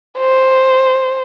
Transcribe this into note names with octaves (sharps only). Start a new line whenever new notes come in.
C5